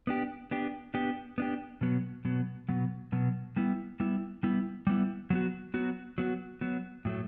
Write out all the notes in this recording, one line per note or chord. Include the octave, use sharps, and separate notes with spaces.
B3 D4 G4
B3 D4 G4
B3 D4 G4
B3 D4 G4
B2 F#3 B3
B2 F#3 B3
B2 F#3 B3
B2 F#3 B3
G3 B3 E4
G3 B3 E4
G3 B3 E4
G3 B3 E4
F#3 B3 F#4
F#3 B3 F#4
F#3 B3 F#4
F#3 B3 F#4
A2 F#3 A3